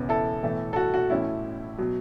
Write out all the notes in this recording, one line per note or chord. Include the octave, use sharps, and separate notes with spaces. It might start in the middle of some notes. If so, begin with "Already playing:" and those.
Already playing: E1 E2 C#3 E3 B3
E4 A4
B1 A2 E3 A3 E4
A4
F#4
F#4
A1 A2 A3 C#4 E4
B2 F#3